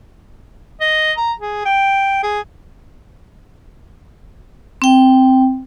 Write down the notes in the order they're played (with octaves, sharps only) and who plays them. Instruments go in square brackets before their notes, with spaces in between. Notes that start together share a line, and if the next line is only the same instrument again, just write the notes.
[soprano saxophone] D#5
A#5
G#4
G5
G#4
[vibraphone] C4 G5